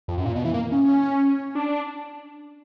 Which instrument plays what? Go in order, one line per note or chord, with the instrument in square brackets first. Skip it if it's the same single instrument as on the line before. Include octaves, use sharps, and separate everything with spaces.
[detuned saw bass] F2
F#2
A#2
B2
E3
A#3
C#4
D4